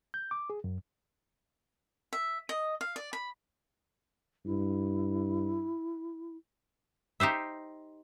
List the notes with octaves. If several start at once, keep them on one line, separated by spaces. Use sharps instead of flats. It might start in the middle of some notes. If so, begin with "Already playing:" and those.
G6
D6
G#4
F#2
E5
D#5
F5
D5
B5
G2 E4
D#4 G4 C5 E5